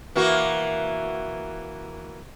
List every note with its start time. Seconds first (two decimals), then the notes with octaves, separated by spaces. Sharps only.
0.16 E3 A#3 F#4